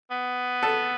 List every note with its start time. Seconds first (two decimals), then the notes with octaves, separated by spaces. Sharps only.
0.11 B3
0.63 A4